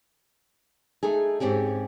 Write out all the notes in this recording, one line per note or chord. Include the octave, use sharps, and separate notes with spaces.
A3 D#4 G#4
G#2 C4 C#4 G4 G#4